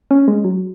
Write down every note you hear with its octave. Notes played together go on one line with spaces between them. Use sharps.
C#4
G#3
F#3